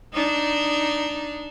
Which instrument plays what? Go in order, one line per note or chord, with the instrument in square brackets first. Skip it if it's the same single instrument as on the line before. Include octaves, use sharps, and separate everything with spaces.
[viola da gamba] D4 D#4